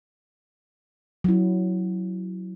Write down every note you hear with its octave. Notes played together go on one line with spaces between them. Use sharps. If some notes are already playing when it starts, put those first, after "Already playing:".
F#3 E4